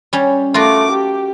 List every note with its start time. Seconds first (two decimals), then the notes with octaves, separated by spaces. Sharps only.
0.13 G3 C#4
0.54 A3 F4 F#4 A#4 D6
0.91 G4